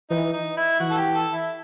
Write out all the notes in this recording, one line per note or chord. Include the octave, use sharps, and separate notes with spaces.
E3 D#4
D#4
E4
E3 F#4
A4
G4
A4
E4